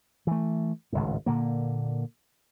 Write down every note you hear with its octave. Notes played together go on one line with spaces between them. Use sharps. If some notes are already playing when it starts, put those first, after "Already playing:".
E3 A3
G#1 C#2 A2
A#2 D3 A#3